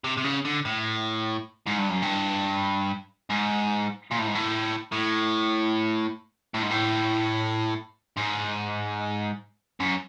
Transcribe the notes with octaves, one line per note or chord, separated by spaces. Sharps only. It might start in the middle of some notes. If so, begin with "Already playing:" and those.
C3
C3
C#3
D3
A2
G#2
G2
F#2
G2
G#2
A#2
A2
G#2
A2
A2
A2
G#2
A2
G#2
F#2